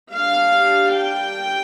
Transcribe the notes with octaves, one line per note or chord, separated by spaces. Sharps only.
G3 D4 F5
G5